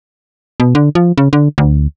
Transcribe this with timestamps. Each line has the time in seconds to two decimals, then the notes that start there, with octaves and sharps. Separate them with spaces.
0.60 B2
0.75 D3
0.95 F3
1.18 C#3
1.33 D3
1.58 D2